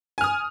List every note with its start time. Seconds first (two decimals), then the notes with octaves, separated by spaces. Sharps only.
0.18 G#5
0.21 F6
0.24 D#6